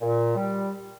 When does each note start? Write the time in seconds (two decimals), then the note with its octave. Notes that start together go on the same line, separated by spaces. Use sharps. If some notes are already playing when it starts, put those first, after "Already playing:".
0.01 A#2
0.36 G3